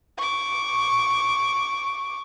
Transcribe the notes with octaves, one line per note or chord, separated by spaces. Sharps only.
C#6 D6